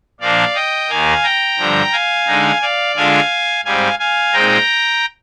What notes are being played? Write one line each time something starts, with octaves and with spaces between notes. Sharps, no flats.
A#2 F3 A#3 D4 D5 F5
D#5 G5
D#2 D#3 A#3 F5 G#5
G5 A#5
G2 D3 F3
F5 G#5
D3 G#3 D#4
D5 F5
D3 G#3 D4 F4 F5 G#5
G#2 G3 C4 F5 G#5
F5 G#5
A#2 G#3 C4 D#4 G5 A#5